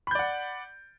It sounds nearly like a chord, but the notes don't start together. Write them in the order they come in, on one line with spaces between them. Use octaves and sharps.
B5 G6 D5 F#5